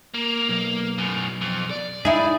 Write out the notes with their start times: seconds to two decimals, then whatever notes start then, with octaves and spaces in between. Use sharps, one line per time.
0.14 A#3
0.49 B1
0.98 F#2 A2
1.41 F2
1.70 D5
2.05 D#4 E4 G#4